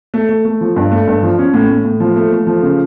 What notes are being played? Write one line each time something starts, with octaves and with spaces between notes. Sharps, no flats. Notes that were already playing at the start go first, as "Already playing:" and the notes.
A3
A3
A3
F3
G2
A3
G2
F3
C#4
A2
A2
A2
F3
A3
A3
F3
C#3